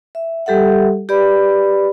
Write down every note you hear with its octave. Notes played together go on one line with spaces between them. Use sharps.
E5
G3 G4 A4 E5 F#5
G4 B4 D5 B5